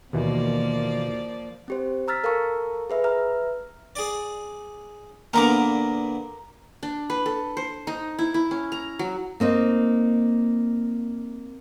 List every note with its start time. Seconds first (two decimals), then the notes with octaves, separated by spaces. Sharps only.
0.13 D#2 B2 E3 F3 A#3 D5
1.68 C4 G4 C5
2.08 A#5 E6 F6 A6 B6
2.24 A4 A#4 F5 A5 A#5 C#6
2.90 G#4 B4 E5
3.04 B4 E5 A#5 F6
3.96 G#4 D5
5.33 A#2 D3 B3 A#4 A#5 D6
6.83 D4
7.10 B4
7.26 A4
7.57 C5
7.87 D#4
8.19 E4
8.34 E4
8.51 C#4
8.72 A#5
8.99 F#3
9.40 A#3 C4 D#4